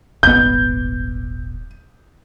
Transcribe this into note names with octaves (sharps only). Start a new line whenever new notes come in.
D#1 G#1 B3 G6